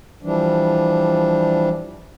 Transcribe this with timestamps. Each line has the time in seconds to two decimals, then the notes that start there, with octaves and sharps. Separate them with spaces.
0.23 E3 F3 G3 D4